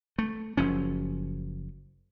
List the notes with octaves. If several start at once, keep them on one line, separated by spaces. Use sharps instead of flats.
A3
F#1 F3 C#4